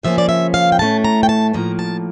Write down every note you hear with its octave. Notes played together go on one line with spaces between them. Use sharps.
C#3 F3 A#3 C#4 E5
D5
E5
F5
G5
A2 E3 A3 C#4 A5
A#5
G5
A5
A2 F3 A#3 A#5
A5